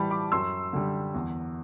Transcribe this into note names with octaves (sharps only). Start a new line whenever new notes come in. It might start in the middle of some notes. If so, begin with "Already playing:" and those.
Already playing: A2 E3 G3 G5 A5 B5
B5 D6
F#2 C6 E6
D3 G3
E2